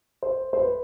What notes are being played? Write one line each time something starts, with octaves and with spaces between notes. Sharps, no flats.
C5
C5
B4